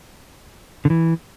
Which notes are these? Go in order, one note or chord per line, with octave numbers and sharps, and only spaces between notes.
D3
E3